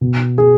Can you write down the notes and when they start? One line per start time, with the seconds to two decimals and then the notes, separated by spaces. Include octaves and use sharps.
0.01 B2
0.38 G#4